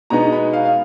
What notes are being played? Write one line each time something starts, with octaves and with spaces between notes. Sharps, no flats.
B2 G#3 B3 D#4 A#5
B5
F5
F5